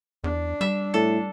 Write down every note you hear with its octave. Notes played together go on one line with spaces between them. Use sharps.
E2 D4
G3 E5
A2 A4